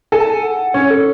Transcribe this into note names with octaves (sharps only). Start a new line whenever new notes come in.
A4 G#5
A5
G#5
F#5
C#4 C#5
A4